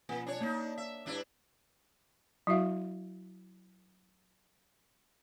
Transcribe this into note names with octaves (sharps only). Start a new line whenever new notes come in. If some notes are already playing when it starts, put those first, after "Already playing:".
B2 F3 A#3 G#5
D4 C#5
A#3 D4 D#4
E5
G2 D4 E4
F#3 E4 F#4 E5 F5